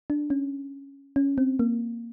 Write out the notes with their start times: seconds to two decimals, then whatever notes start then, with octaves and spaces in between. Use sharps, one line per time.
0.10 D4
0.30 C#4
1.16 C#4
1.38 C4
1.59 A#3